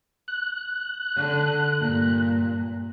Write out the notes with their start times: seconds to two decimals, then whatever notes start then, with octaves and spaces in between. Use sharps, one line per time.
0.28 F#6
1.16 D3
1.80 G2 A#2